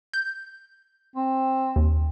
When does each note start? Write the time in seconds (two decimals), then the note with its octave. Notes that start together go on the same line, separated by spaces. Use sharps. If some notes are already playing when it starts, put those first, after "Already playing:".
0.14 G6
1.16 C4
1.76 D#2